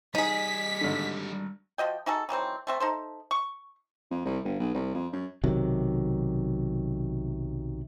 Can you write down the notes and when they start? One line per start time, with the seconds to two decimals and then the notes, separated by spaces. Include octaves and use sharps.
0.15 G3 D#4 G#4 D#5 B6
0.81 G#1 D3
1.78 F3 F#4 D#5 G5
2.06 D#4 F#4 G#4 A4
2.29 D#3 E3 F#3 C4
2.67 A3 C4 E5
2.80 D#4 A4 C5
3.31 C#6
4.11 F2
4.25 C2
4.44 G1
4.60 B1
4.74 C2
4.94 F2
5.12 F#2
5.43 B1 C3 D#3 F#3